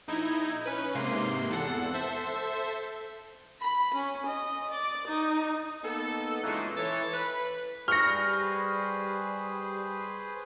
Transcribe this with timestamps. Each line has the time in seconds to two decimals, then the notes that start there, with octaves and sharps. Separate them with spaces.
0.08 A#1 D#4 E4 G#6
0.65 C#4 B4
0.94 G#2 C3 A#3 C6 C7
1.49 G#1 E2 A4 F#5
1.93 A4 C5 E5
3.61 B5
3.95 C#4
4.27 D#5
4.71 D5
5.08 D#4
5.84 A#3 B3 D#4 A4
6.43 A#2 C#3 E3 G#3 A3 D#4
6.77 E3 A4 C#5
7.13 B4
7.88 G3 G#4 B4 C5 C#6 F6 A#6 C#7